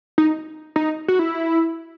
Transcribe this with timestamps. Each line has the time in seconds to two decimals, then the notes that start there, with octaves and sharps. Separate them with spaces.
0.18 D#4
0.76 D#4
1.08 F#4
1.19 E4